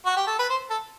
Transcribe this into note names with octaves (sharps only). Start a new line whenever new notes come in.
F#4
G4
A4
B4
C5
A4